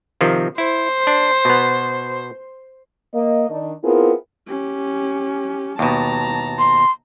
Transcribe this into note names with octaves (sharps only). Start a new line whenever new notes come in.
C3 D#3 F3
E4 C5
D4
B2 B3
A#3 D#5
D#3 D4
B3 C4 E4 F4 G#4 A#4
C#4 G4
D#2 B2 A5 A#5
C6